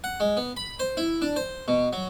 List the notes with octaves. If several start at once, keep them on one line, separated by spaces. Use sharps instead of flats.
F#5
G#3
B3
B5
C5
E4
D4
C5
B2
F#3